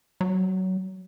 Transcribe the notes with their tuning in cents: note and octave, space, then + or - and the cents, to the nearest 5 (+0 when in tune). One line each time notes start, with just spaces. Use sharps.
F#3 +20